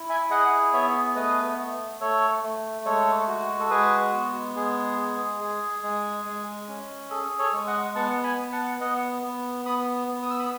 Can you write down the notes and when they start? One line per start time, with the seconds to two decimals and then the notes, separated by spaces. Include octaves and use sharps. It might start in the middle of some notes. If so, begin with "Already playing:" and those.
Already playing: E4
0.10 E5 G#5
0.30 G#4 D#5 F#5
0.73 B3 C#5 E5
1.15 A3 B4 D#5
1.59 A3
2.01 A3 A4 C#5
2.43 A3
2.85 G#3 A4 C#5
3.28 F#4
3.60 A4
3.70 G#3 G#4 B4
4.13 B3
4.56 G#3 G#4
4.98 G#4
5.40 G#4
5.83 G#3
6.25 G#3
6.69 C#4
7.10 G#4 A4
7.39 A4 C#5
7.53 G#3
7.67 D#5 F#5
7.95 B3 F#5 A5
8.24 G#5 B5
8.38 B3
8.52 F#5 A5
8.81 B3 D#5 F#5
9.23 B3
9.65 B3 B5 D#6
10.08 B3
10.22 D#6
10.30 E6
10.39 B5 D#6